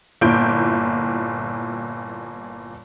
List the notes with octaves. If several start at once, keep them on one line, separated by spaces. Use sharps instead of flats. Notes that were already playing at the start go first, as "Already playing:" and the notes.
G1 A#2 E4 G6 D7